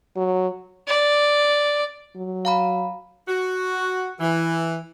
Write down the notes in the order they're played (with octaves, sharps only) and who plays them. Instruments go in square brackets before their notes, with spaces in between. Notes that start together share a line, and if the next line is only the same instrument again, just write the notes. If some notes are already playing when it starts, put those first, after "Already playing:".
[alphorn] F#3
[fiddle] D5
[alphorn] F#3
[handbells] F5 A#5 B5
[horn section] F#4
E3